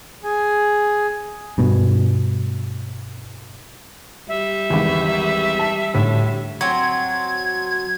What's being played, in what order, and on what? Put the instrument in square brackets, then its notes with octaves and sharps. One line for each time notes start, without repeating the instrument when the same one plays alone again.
[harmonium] G#4 G#5
[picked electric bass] G2 B2
[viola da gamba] G3 [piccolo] E5
[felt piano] G#1 E2
A5
D2 A2
[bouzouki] F#3 C4 [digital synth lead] G#6